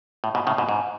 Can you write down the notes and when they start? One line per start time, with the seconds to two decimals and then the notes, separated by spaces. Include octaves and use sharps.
0.24 A2
0.35 G#2 B2
0.47 A2 C#3
0.58 G#2 B2
0.69 G#2